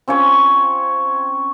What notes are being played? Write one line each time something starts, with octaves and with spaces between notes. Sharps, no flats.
C4 C#4 F4 C#5